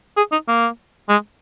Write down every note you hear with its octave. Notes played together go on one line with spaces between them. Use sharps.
G#4
D#4
A#3
G#3